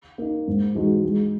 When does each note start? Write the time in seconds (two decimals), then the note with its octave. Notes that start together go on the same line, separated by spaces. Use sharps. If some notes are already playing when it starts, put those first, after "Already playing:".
0.18 A#3 D#4
0.48 G#2
0.75 E3 G#3 D#4 F#4
1.04 G#3